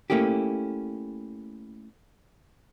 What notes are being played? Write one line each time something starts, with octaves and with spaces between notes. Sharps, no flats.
A3 A#3 C#4 E4 G4